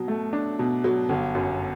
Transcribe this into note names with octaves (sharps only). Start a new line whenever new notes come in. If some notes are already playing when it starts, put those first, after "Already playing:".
Already playing: B2 F#3
A3
D4
B2
F#3
G1
F#2